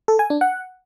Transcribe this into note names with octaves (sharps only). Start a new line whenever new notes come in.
A4
G#5
D4
F#5